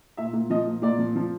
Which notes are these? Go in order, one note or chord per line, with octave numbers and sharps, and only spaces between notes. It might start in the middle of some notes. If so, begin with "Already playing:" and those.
A#2 E5
A#2
F3 D#5
A#2
A#2 D5
F3
F3